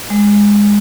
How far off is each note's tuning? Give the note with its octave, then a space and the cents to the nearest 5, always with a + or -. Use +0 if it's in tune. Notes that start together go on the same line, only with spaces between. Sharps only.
G#3 -15